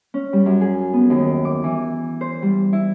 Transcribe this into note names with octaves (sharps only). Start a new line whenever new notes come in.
C#4
G3
F#2
G#4
B3
D#2
D6
E3
C5
G3
E4